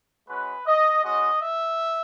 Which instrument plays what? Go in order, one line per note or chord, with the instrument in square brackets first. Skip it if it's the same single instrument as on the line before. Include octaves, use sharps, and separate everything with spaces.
[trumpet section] G#3 C#4 F#4 B4
D#5
G#3 C#4 F#4 D#5
E5